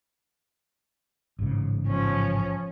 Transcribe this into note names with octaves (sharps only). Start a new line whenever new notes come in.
A1 G#2 C#3
F3 C#4